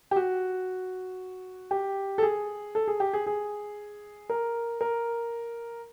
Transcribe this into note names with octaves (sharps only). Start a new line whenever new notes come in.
G4
F#4
G4
A4
G#4
A4
G#4
G4
G#4
G#4
A#4
A#4